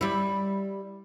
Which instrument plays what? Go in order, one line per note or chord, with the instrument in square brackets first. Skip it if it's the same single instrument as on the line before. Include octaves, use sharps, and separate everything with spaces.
[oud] G3 E4